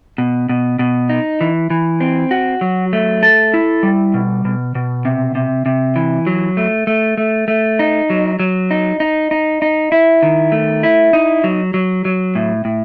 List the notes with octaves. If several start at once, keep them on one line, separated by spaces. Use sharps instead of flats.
B2
B2
B2
D#4
E3
E3
C4
F#4
F#3
A3
A4
E4
G3
B2
B2
B2
C3
C3
C3
E3
F#3
A3
A3
A3
A3
D#4
F#3
F#3
D#4
D#4
D#4
D#4
E4
D#3
A3
E4
D#4
F#3
F#3
F#3
A2
A2